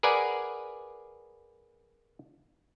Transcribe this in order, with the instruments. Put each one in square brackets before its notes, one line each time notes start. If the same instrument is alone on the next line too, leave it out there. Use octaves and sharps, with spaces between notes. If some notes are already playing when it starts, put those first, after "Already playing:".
[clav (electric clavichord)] G#4 A#4 B4 D5 F#5 G#5